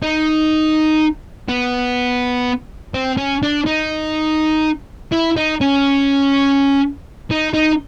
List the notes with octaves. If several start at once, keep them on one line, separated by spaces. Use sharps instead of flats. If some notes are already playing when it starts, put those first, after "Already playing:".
D#4
B3
C4
C#4
D4
D#4
E4
D#4
C#4
D#4
D#4